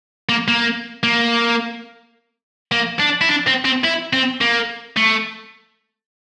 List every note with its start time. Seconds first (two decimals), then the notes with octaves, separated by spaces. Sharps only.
0.29 A#3
0.48 A#3
1.03 A#3
2.72 A#3
3.00 D4
3.21 E4
3.29 D4
3.47 C4
3.65 C4
3.84 E4
4.13 C4
4.41 A#3
4.96 A3